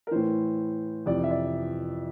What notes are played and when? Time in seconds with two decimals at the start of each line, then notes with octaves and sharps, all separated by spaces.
0.07 A#4
0.11 A2 E3 C5
1.06 F2 C3 E3 D5
1.24 E5
1.30 D5